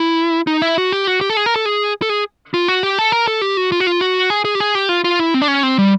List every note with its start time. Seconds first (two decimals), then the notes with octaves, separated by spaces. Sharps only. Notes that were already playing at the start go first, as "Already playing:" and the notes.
Already playing: E4
0.47 D#4
0.62 E4
0.78 F#4
0.92 G4
1.07 F#4
1.21 G4
1.30 A4
1.37 G#4
1.46 A#4
1.56 A4
1.65 G#4
2.02 A4
2.10 G#4
2.54 F4
2.68 F#4
2.83 G4
2.99 A4
3.12 A#4
3.28 A4
3.42 G4
3.57 F#4
3.72 F4
3.80 F#4
3.87 F4
4.01 F#4
4.30 G#4
4.45 G#4
4.55 G4
4.60 G#4
4.75 G4
4.89 F4
5.04 F4
5.19 E4
5.34 C4
5.42 D4
5.48 C#4
5.63 C4
5.78 G3